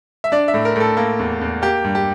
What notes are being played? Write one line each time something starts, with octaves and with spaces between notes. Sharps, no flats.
E5
D4 D5
E5
A2
A#4
A2 A4
A#3
E2
E2
A#3 G4
G2
G4